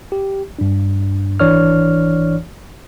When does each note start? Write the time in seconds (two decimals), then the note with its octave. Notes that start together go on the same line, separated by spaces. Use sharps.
0.12 G4
0.59 G2 D4
1.40 G#1 E3 D4 C#5 D5 F6